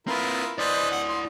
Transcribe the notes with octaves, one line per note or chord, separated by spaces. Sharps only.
C4 E4 F4 A#4 B4
E4 B4 C5 D5 D#5
F#5
C6